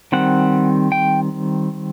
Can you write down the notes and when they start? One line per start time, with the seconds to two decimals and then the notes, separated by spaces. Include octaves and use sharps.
0.12 D#3 G3 C4 F#5
0.92 G5